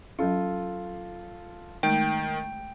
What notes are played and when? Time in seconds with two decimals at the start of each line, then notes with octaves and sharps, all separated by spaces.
0.19 F#3 C#4 F4 A4
1.83 D#3 G#3 A3 G5